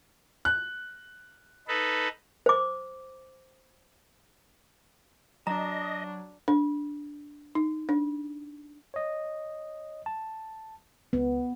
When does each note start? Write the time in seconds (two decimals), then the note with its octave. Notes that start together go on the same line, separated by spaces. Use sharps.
0.45 F#6
1.68 D#4 A4 B4
2.46 C5 D6
5.47 F#3 D4 D#5 A#5
6.48 D4
7.55 D#4
7.89 D4
8.94 C#5 D#5
10.06 A5
11.13 C#2 B3